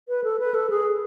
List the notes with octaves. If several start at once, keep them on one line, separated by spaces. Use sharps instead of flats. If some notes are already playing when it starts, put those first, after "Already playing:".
B4
A4
B4
A4
G#4